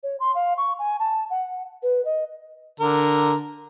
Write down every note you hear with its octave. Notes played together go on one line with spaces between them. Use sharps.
C#5
C6
F5
C#6
G#5
A5
F#5
B4
D#5
D3 A#4